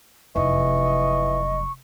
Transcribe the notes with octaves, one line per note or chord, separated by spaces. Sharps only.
F1 F#2 E3 D#5 C#6